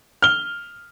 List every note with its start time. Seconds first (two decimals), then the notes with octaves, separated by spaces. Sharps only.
0.22 F6 G7